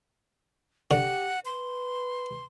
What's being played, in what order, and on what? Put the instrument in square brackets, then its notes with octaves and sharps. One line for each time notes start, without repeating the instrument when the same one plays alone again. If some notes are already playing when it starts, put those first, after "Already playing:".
[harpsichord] D3 [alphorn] G4 [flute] F#5
[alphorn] B4 [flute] C6